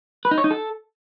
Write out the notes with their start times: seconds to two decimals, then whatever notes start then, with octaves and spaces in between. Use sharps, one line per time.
0.25 B4
0.31 D#4
0.38 C#5
0.44 D#4
0.51 A4